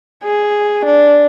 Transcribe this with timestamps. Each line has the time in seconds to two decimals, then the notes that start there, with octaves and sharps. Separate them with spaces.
0.23 G#4
0.86 D4